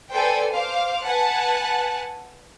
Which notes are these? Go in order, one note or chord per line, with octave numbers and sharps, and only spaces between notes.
A4 B4 C5 D5 G5 G#5
C5 F5 D6
B4 F#5 G#5 A5 F#6